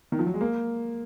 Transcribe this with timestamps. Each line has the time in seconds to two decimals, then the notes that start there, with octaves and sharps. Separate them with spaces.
0.12 D#3
0.19 F3
0.26 F#3
0.34 G#3
0.41 A#3